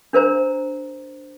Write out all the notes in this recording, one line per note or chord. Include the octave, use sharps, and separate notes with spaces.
D4 A#4 C5 A#5